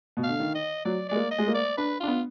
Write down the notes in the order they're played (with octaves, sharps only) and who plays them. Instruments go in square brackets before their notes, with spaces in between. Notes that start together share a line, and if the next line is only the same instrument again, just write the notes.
[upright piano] B2
[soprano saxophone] F5
[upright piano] D3
D#3
[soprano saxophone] D#5
[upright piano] F#3 [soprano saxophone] D5
[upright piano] G#3 [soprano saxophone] D5
[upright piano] A#3
[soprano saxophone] D#5
[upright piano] G#3
A#3
[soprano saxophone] D5
[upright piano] D4 [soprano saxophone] B4
[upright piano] D4 [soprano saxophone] F4
[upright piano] B3